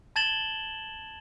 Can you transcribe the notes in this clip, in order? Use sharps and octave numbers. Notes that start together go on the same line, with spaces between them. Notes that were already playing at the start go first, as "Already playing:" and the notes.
A5 G#6 A6 E7 F#7 G7